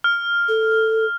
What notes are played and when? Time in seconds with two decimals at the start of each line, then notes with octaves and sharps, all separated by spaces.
0.04 F6
0.48 A4